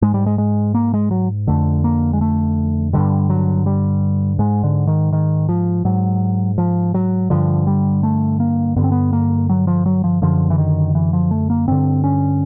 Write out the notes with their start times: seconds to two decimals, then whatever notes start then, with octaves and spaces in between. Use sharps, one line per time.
0.02 G#2 G#3
0.14 G3
0.26 G#3
0.38 G#3
0.74 A#3
0.94 G#3
1.11 F#3
1.47 F2 D3 A3
1.84 A#3
2.13 G#3
2.21 A3
2.93 G2 D3 G3
3.30 F#3
3.66 G3
4.39 G#2 G#3
4.64 D3
4.87 D#3
5.12 D#3
5.49 F3
5.85 G#2 F#3
6.58 F3
6.94 F#3
7.30 G2 D3 F3
7.67 G3
8.03 A3
8.40 A#3
8.76 G2 D3 B3
8.84 C4
8.92 B3
9.13 A#3
9.49 F#3
9.67 F3
9.86 F#3
10.04 F3
10.22 F#2 D3 F3
10.50 E3
10.58 D#3
10.95 E3
11.13 F3
11.31 A3
11.50 A#3
11.68 G2 D3 C4
12.04 C#4